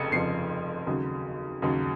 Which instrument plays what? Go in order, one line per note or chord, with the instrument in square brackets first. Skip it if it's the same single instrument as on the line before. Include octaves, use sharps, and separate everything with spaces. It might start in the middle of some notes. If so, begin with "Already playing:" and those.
Already playing: [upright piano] F1 F2 C#3 C#7
F1 F2 C#3 F3 C7
D#2 C#3 F#3
D#2 C#3 F#3